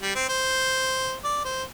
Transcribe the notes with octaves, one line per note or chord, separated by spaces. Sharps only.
G3
C4
C5
D5
C5